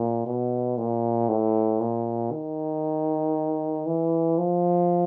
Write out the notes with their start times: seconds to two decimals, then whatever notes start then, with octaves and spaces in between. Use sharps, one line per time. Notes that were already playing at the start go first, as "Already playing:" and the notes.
Already playing: A#2
0.26 B2
0.77 A#2
1.29 A2
1.81 A#2
2.31 D#3
3.86 E3
4.38 F3